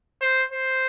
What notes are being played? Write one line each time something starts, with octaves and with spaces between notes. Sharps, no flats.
C5
C5